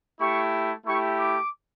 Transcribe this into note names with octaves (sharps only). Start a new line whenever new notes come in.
A3 E4 G4 C#6
A3 E4 G4 C#6
D6